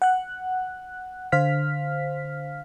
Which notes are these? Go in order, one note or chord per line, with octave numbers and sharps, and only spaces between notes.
F#5 F#6
D3 C5 F5 F6 B6